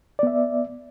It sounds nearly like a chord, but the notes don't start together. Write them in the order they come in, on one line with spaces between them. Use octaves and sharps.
D5 B3 E5